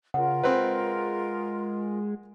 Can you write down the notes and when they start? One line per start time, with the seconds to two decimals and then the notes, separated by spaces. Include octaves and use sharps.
0.14 C#3 F4 A#4 F#5
0.44 G#3 C4 B4